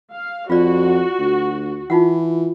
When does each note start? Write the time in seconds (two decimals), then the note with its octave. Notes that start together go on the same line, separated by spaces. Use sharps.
0.12 F5
0.50 F2 F4 F#4 D5
1.19 D2
1.90 E3 D#4 F4 F#5